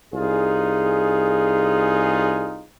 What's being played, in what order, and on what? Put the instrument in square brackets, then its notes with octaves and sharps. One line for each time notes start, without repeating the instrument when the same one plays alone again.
[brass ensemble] C2 D#4 F4 G#4